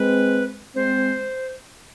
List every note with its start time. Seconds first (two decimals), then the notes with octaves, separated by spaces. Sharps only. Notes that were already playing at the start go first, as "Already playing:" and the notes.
Already playing: G#3 C4 B4
0.75 G#3 C4 C5